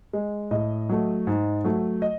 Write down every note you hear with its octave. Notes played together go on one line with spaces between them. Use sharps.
G#3
A2 D#5
F#3 A3
G#2
F#3 A3
D#5